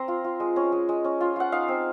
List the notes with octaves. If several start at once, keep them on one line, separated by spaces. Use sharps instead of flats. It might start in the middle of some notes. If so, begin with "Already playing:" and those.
Already playing: C4 A#5 C6
F4
F4
G#3
C#4
G#3
G#3
C#4
F4
F4 F#5
D#4 F5
C4